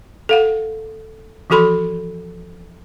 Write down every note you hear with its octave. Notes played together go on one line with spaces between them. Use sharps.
A4 F5 F#5
E3 F3 F#4 A4 B5 C6